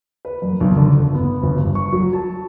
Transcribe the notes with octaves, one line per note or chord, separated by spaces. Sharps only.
B4
F#2
B1
D3
G1
B3
G1
G2
C#6
F#3
A5